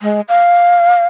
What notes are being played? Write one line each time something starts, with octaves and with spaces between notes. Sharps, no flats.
G#3
F5